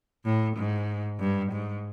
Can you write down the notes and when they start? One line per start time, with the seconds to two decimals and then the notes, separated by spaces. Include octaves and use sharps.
0.25 A2
0.57 G#2
1.20 G2
1.52 G#2